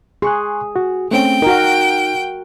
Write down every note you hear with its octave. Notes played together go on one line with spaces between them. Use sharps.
G#4 C6 C#6 F#6
F#4
A3 C4 C#4 G5
D#4 F#4 A#4